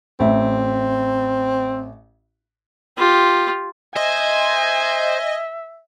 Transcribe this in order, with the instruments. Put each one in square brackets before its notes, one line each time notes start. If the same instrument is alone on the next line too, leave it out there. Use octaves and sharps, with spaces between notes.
[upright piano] A1 E5 [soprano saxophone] C4
[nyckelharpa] F4 G4
[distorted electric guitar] C5 [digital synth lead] D#5 [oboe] E5 [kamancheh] G#5